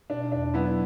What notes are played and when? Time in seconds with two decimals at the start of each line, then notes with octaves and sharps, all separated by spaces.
0.09 B2 D4
0.32 E2 D4
0.54 F#3 B3 E4